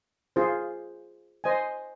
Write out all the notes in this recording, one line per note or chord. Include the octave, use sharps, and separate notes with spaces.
F4 G#4 C5
C5 D#5 G#5